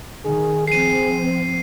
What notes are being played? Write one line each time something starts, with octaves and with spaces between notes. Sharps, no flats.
D#3 G#4
F3 C4 G#4 C7 D#7